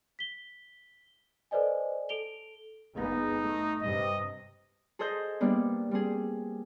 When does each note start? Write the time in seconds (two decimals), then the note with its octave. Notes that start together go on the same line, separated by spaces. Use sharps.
0.19 B6 G7
1.51 A4 B4 C5 D5 D#5 G#5
2.09 A4 D7 F7 G7
2.98 G1 G#3 B3 D#4
3.43 A3
3.81 G2 C3 D#5
4.99 G#4 A4 C5 D#5 G6
5.41 G3 A#3 B3 D4
5.91 G3 C4 G#4